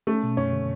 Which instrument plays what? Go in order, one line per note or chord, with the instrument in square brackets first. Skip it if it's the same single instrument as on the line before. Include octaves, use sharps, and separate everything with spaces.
[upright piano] A3 [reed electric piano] C#4
[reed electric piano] B2
[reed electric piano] F#2 [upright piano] C#4
[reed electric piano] D3